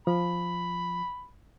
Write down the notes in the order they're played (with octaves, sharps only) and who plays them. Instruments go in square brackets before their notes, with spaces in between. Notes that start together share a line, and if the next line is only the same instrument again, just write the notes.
[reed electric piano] F3 [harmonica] B5